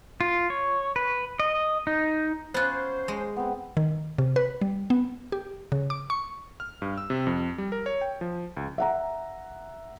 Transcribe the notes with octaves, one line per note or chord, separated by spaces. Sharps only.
F4
C#5
B4
D#5
D#4
B3 C#4 F4 C5 F#6
G#3
B3 C4
D#3
C3
B4
G3
B3
G4
C#3
D6
C#6
F6
G2
E6
C3
F2
G3
A#4
C#5
G5
F3
C#2
E5 F#5 A#5